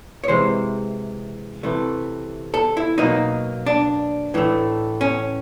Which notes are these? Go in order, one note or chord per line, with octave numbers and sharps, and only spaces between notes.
C#5
C3 E3 G#3 C5
C3 E3 A3
A4
E4
B2 F#3 A#3 D#4
D4
A2 E3 A3
C#4